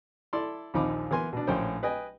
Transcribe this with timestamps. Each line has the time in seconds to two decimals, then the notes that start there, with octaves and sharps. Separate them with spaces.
0.33 E4 A4 D5 C6
0.74 A#1 D#2 F3 D#4 B5 D6
1.11 E3 B3 A#4 G#5 C6
1.33 B2 D4
1.47 A#1 A2 C#4 C5 G5
1.83 B4 D#5 G5 G#5